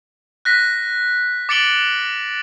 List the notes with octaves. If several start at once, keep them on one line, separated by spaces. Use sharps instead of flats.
F#6 A#6 B6
D6 A6 C#7 D7 F#7 G7